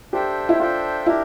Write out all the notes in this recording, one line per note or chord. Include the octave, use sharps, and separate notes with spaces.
D4 G4 A4 C5 E5 G5
E4
D4 F4 A4 C5 E5 G5
D4 E4 G4 A#4